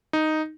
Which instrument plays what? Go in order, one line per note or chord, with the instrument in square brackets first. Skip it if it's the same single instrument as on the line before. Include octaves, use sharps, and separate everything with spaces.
[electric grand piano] D#4